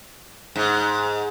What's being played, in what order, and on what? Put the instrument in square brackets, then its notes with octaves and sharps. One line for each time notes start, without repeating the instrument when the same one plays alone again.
[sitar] G#2